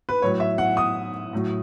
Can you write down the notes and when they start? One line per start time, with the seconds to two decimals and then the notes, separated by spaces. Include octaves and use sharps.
0.09 B4
0.22 A2 F#3 C#5
0.40 E5
0.58 F#5
0.77 D#6
1.33 A2 F#3